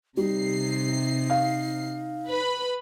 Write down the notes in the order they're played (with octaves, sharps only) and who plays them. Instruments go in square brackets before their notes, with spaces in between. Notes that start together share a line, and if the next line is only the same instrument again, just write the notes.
[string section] C3 C7 [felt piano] G3 [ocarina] D#4
[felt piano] F5
[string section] B4 B5